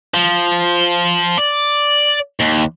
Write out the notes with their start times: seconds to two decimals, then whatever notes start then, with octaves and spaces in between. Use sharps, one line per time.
0.14 F3
1.38 D5
2.41 D#2